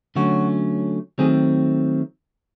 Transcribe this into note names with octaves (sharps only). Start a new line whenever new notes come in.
D3 F#3 A3 C#4 F#4
D#3 F#3 A3 C4 G#4